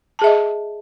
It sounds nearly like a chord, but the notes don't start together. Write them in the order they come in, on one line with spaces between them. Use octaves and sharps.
A5 G#4 E5 D#5